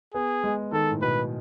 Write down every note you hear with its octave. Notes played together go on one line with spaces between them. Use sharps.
B3 G#4
G#3
D#3 A4
A2
B2 B4